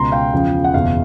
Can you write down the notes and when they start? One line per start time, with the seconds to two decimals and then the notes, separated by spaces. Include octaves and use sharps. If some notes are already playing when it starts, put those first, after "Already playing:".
Already playing: C#2 B2 A#5 C6
0.12 F5 G5
0.33 E2 C#3 F3
0.64 F#5
0.74 F#1 E2 B2 F5